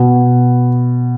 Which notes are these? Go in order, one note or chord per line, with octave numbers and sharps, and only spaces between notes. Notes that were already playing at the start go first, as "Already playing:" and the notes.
Already playing: B2